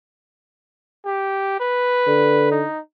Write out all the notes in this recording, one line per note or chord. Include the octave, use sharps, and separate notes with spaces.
G4
B4
D3
D#4